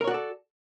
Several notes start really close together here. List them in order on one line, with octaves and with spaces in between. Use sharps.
A#4 C#5 F#4 D5 A4